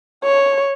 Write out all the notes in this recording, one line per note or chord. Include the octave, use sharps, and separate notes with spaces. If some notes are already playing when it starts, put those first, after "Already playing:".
C#5